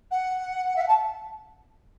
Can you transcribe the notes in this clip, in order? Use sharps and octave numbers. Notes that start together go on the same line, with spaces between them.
F#5
E5
F#5
A5